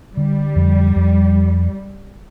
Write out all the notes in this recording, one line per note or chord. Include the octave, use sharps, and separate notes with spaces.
D3 G3
F2
F2